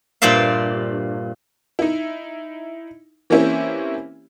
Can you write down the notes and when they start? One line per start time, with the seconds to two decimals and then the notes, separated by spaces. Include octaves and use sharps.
0.22 G2 A#2 C5 D5 E5 F5
1.79 D#4 E4
3.30 E3 A#3 C4 C#4 E4 G4